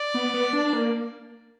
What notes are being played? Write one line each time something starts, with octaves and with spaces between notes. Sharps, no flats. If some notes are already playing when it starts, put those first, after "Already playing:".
Already playing: D5
B3
B3
D4
A#3